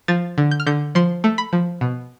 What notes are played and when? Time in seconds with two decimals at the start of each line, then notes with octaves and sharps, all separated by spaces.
0.08 F3 A6
0.38 D3
0.51 G6
0.60 F6
0.67 D3 G6
0.95 F3 C6
1.24 A3
1.38 B5
1.53 F3
1.81 B2